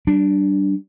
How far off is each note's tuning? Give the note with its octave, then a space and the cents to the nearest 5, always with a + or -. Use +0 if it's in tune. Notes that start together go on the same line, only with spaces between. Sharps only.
G3 -30 D4 +0